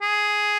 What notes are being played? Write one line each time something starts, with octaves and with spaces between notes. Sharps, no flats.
G#4